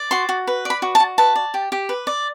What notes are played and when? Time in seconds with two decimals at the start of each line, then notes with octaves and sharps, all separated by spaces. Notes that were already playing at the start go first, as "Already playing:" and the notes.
Already playing: D5
0.11 F#4 C6
0.29 F#4
0.47 B4
0.65 D5 B5
0.82 F#4
0.95 A5
1.00 F#4
1.18 B4 A5
1.36 D5
1.54 G4
1.72 G4
1.89 B4
2.07 D5